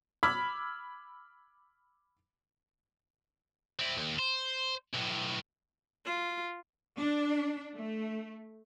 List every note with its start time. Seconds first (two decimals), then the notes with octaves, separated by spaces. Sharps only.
0.23 B5 D6 E6 F6 G#6 B6
3.80 C4 E4
3.97 D#2
4.19 C5
4.94 B1 A2
6.06 F4
6.97 D4
7.74 A3